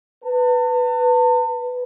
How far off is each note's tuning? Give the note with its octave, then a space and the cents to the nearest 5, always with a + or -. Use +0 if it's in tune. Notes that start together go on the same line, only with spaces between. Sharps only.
B4 +5 A5 +40